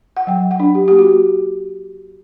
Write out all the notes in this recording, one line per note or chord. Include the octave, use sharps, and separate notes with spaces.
F#5
F#3 G5
F#5
D4
G4
A#3 G4
F#4